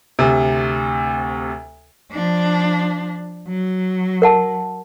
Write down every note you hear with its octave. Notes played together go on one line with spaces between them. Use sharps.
D2 C3
F3 D4
F#3
A#4 F#5 A5